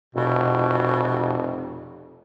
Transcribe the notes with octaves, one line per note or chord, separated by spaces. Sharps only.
F1 B2